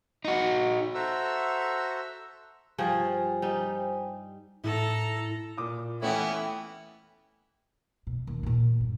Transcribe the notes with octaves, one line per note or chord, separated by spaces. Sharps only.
D#4 F#4
F#4 A4 C5 E5 A#5 E6
G2 F3 G#4 C5 G5 G#5
G3 D#4
A2 E4 A4 A#5
A#2 D6 D#6
E3 A3 B3 C#4 E4 G5
B2
D#2
A#2 A#3
G2